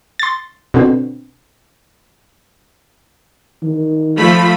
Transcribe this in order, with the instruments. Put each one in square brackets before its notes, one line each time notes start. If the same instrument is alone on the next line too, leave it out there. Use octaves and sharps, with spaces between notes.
[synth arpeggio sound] C6 A6
B2 D3 C4
[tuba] D#3
[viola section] F3 A3 B5